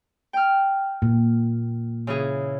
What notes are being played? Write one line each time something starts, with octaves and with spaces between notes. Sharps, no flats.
G5 F6
A#2
C#3 E3 G#4